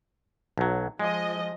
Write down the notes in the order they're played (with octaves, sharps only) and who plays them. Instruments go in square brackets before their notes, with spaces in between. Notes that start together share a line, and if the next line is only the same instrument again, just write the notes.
[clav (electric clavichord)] B1 F#3
[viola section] F3 D#5 [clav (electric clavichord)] G#3